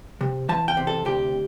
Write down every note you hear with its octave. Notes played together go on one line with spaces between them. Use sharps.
C3
E3 A5
G5
C3
A4
D2 G4